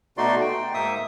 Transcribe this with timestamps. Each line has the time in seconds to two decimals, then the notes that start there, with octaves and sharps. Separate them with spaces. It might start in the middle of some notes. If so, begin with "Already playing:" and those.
0.18 B2 A3 D#4 F#4 D5 C6
0.41 G5
0.74 G#2 A#3 D#4 E5 D#6